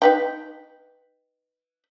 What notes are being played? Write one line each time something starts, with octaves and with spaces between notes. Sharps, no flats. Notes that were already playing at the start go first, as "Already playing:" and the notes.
D#4 B4 G5